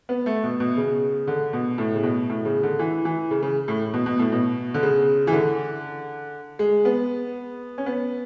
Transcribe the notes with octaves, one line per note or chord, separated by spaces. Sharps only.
B3
A3
B2
B2
C#3
D3
B2
A2
C#3
B2
A2
C#3
D3
E3
E3
C#3
C#3
A2
B2
B2
A2
B2
D3
C#3
E3
D3
G#3
B3
C#4
B3